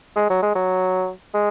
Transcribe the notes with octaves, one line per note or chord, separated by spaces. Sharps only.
G#3
F#3
G#3
F#3
G#3